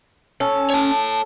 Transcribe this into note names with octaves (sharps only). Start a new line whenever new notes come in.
C#4 A4
C#5 A5